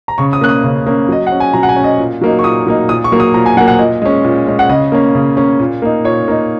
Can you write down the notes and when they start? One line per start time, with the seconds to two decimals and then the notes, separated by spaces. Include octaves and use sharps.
0.08 A#5
0.18 C#3 C#6
0.33 D#6
0.41 A#3 C#4 F#6
0.49 D#6
0.64 C#3
0.86 A#3 C#4
1.09 F#3 D#5
1.27 F#5
1.32 C#4
1.40 G#5
1.53 F#3 A#5
1.63 F#5
1.69 G#5
1.76 C#4
1.84 D#5
1.98 A#2
2.21 F#3 A#3 D#4
2.39 C#6
2.44 A#2 D#6
2.67 F#3 A#3 D#4
2.89 A#2 D#6
3.04 C#6
3.12 F#3 A#3
3.20 D#6
3.34 A#2 A#5
3.46 G#5
3.57 F#3 F#5
3.60 A#3
3.68 F#5
3.79 A#2 D#5
4.02 G#3 C#4
4.24 A#2
4.47 G#3 C#4
4.59 F#5
4.69 C#3 D#5
4.92 A#3 C#4
5.15 C#3
5.37 A#3 C#4
5.59 A#2
5.82 A#3 D#4
6.04 A#2 C#5
6.28 A#3 D#4